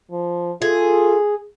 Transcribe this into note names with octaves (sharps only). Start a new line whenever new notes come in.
F3
F4 G#4 A4